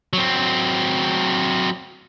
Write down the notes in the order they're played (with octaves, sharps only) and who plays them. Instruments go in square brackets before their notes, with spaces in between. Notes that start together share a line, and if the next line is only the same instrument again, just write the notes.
[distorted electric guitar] F#3 C4